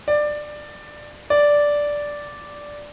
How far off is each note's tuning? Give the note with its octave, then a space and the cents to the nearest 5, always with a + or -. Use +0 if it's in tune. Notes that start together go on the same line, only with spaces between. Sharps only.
D5 +15
D5 -5